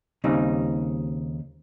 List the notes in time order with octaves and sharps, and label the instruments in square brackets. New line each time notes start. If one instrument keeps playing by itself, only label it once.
[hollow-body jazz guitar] D#2 C#3 G3 C4 D#4